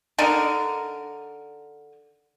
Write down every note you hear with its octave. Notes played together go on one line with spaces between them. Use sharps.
D3 D4 D#4 A#4